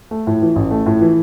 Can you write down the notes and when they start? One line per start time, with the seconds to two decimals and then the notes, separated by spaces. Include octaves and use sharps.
0.11 A3
0.27 A2
0.42 E3
0.56 A1
0.71 A3
0.86 A2
1.01 E3